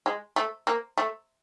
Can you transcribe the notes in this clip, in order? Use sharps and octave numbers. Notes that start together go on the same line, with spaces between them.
G#3
A3
A#3
A3